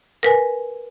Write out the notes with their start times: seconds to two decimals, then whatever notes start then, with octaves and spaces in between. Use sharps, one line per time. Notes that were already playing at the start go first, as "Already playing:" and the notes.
0.23 A#4 B4 G#5